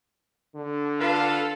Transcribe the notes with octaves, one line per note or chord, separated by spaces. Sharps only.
D3
F4 A4 B4 F5